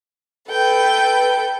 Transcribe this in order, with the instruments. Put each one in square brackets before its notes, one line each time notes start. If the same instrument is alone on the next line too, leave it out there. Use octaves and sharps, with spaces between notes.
[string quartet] A4 B4 G5